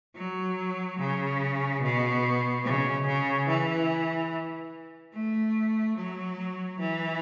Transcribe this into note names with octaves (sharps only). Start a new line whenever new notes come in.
F#3
C#3
B2
C#3
C#3
E3
A3
F#3
E3